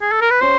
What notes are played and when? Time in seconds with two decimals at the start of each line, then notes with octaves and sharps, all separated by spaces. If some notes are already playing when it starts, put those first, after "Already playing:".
0.01 G#4
0.11 A4
0.21 A#4
0.31 B4
0.41 C#4 F#4 C5